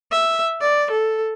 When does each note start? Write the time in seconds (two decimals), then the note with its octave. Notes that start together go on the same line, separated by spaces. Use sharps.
0.12 E5
0.61 D5
0.91 A4